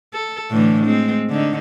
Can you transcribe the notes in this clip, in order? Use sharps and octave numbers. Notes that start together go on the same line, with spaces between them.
A4
A2 D3 E3
G#3 C4
D3 D#4